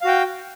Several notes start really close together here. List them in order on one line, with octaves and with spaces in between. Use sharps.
F5 F#4 G5